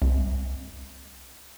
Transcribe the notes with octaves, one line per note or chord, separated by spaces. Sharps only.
C2